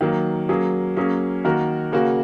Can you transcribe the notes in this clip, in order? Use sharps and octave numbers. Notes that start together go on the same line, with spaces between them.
D#3 F#3 A#3
F#3 A#3 C#4 G#4
F#3 A#3 C#4 G#4
D#3 A#3 F#4 A#4
C#3 A#3 F#4